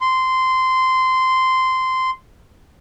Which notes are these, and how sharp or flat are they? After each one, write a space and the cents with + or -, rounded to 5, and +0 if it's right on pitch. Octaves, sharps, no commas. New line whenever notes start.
C6 -15